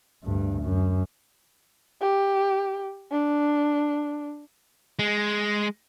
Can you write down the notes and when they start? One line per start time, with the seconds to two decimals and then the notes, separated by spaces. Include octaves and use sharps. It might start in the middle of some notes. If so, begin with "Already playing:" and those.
0.24 D2 G2
0.62 F#2
2.01 G4
3.12 D4
4.99 G#3